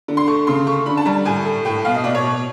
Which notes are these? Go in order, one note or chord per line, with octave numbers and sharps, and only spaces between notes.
D3
C6
A3 C#6
C#3 C6
A3 C#6
D3 B5
A5
G3 A#5
A2 G#5
A3
A2 G5
B2 F5
D#5
B2 D5
C#5
B2